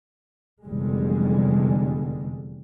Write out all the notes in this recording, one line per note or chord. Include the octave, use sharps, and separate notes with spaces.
F1 E2 D3 G3 G#3